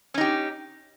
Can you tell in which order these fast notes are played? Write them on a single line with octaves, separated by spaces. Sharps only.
C#4 D#4 G4